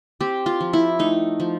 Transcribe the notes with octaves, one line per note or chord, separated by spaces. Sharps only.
C4 G4
F4
F3
E4
A3 D#4
F3